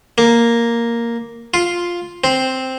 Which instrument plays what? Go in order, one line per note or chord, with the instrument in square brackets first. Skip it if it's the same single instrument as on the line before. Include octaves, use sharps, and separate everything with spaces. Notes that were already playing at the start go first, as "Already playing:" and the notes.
[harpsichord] A#3
F4
C4